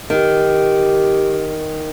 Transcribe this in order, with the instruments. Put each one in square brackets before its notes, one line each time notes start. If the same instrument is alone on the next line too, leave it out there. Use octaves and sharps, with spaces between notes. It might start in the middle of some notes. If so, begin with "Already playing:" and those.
[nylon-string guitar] D#3 [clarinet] G4